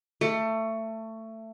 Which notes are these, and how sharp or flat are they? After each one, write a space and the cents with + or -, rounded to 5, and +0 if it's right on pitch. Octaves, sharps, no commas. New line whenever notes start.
A3 +20